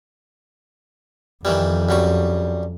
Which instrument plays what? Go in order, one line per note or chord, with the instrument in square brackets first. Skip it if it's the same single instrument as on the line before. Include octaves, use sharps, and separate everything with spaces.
[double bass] F2 [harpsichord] D#3 E3 G3
[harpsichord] F#2 G3 C#6